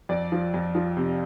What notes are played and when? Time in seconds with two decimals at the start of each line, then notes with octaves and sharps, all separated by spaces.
0.09 F2 D5
0.32 F3
0.54 F2
0.75 F3
0.97 C3